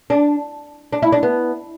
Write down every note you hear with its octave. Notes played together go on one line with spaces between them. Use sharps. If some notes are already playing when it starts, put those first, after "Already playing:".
D4
D4
E4
D4
B3